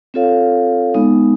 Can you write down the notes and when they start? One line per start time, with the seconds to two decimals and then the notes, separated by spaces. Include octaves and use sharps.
0.14 C4 F4 A4 C#5 F5
0.94 G#3 B3 D#4